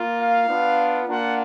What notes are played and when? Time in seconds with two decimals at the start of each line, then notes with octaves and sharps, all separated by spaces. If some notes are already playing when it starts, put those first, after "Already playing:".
Already playing: A#3 F4
0.19 F5
0.48 B3 D4 F4
1.07 A#3 D4 F4 F#5